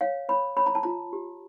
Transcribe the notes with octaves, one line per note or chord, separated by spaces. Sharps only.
C#5 F5
C#5 B5
C#5 B5
A#5
A5
F4 A#5
G4